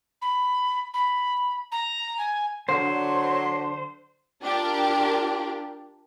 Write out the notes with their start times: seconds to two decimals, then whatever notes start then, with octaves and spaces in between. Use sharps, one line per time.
0.22 B5
0.94 B5
1.72 A#5
2.18 G#5
2.69 D3 F#3 C5
4.42 D4 F4 G4 A#4